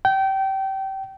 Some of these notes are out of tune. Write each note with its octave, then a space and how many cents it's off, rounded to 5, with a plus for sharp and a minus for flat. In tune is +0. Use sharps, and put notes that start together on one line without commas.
G5 -25